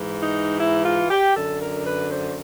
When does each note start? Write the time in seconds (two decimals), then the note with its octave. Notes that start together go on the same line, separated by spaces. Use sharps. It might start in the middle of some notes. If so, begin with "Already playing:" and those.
Already playing: G#2 E3
0.23 D#4
0.60 E4
0.85 F4
1.10 G4
1.36 F#2 D3 A4
1.61 A#4
1.86 B4
2.12 C5